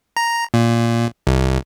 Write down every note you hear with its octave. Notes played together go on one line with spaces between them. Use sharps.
A#5
A#2
C2